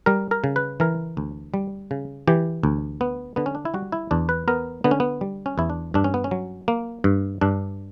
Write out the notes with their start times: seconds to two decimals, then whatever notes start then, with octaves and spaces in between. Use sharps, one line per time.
0.06 G3 A#4
0.31 A#4
0.44 C#3
0.56 B4
0.80 E3 A#4
1.17 D2
1.54 G3
1.91 C#3
2.28 E3 G4
2.63 D2
3.01 B3
3.36 D3 B3
3.46 C#4
3.55 D4
3.65 E4
3.74 G3 F#4
3.92 E4
4.11 E2 D4
4.29 B4
4.48 B3 A#4
4.84 D3 B3
4.91 C#4
5.00 B3
5.21 G3
5.46 C#4
5.58 E2 E4
5.70 D4
5.94 G2 D4
6.04 C#4
6.14 B3
6.24 C#4
6.31 F#3
6.68 A#3
7.04 G2
7.41 G2 D4